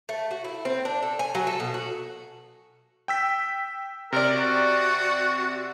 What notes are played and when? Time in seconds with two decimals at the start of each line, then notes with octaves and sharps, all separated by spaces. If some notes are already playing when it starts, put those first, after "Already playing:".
0.09 A3
0.31 F#4
0.44 E4
0.65 C4
0.85 D4
1.02 A4
1.19 G#5
1.35 F#3
1.47 A4
1.60 B2
1.74 F#4
3.08 G5 E6 B6
4.12 C3 A#4 D5
4.35 F#4